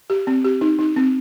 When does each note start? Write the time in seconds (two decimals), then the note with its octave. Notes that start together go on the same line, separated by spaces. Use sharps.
0.10 G4
0.27 C4
0.45 G4
0.61 D#4
0.79 D#4
0.96 C4